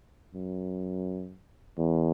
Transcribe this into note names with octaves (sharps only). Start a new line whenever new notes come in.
F#2
E2